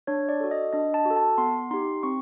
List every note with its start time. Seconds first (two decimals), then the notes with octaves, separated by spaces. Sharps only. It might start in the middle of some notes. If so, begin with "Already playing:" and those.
0.07 D4 C#5
0.29 D5
0.40 F#4 A4
0.51 D#5
0.73 D4 D#5
0.94 A5
1.06 F#4
1.11 A4
1.16 A5
1.38 B3 C6
1.71 D#4 G4 C6
2.03 C4 C#6